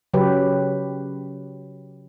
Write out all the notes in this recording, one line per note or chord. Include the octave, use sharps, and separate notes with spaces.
C#3 F#3 G4 B4